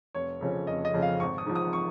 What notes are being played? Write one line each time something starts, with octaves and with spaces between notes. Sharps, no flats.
F1 C#5
F2 C#3 F3 C#4
F1 D#5
D#5
F2 C#3 F3 C#4
F5
G#1 C#6
D#6
G#2 F3
D#6
C#6